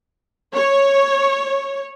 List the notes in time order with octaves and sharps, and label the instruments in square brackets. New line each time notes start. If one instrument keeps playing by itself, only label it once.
[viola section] C#5